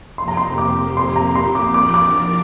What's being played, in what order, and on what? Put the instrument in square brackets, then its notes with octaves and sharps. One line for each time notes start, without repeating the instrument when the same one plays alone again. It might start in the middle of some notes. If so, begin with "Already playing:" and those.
[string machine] F2 C3 A#3 G4 [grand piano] C6
[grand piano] A#5
C6
D6
C6
A#5
C6
D6
[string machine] F3 D4 A#4 D5 [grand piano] D6
[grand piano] D6